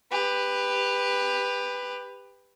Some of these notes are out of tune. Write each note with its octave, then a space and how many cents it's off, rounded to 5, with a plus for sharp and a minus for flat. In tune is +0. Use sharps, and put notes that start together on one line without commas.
G4 +20 B4 +5